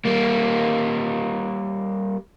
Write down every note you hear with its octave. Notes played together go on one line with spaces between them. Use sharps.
G3 A#3